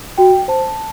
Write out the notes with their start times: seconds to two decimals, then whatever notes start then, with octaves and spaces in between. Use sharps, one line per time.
0.18 F#4 G5
0.48 C5 A5